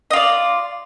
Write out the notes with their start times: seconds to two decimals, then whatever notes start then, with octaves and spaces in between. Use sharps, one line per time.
0.11 D#5
0.13 F4
0.16 D5